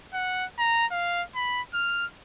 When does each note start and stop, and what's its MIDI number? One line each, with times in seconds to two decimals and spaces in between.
0.13 0.45 78
0.59 0.86 82
0.91 1.22 77
1.35 1.61 83
1.74 2.06 89